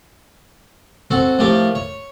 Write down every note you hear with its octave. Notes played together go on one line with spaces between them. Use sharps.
C4 F#4 A4
A2 F3 A3 G4 A#4 D5
C#5